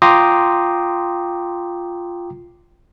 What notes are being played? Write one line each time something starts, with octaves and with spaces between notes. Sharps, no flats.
F4 G5 A#5 C6 D6 D#6